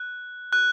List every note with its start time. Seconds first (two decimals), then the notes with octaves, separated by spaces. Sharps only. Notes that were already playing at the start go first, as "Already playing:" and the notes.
Already playing: F#6
0.53 F#6